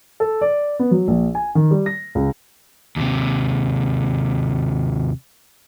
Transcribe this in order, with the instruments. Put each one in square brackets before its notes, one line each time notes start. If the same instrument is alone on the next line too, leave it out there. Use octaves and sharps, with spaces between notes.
[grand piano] A4
D5
B3
F#3
A#1
G#5
D#3
G3
A#6
C#2
[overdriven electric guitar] D#2 C3